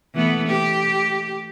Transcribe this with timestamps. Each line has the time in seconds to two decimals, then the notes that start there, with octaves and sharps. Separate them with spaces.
0.15 E3 A3 B3
0.48 G4